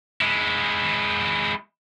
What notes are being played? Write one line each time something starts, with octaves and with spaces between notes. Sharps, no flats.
G#3 E4